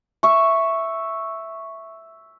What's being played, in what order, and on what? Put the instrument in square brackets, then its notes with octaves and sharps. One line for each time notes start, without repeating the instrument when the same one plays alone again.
[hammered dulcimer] E5 C#6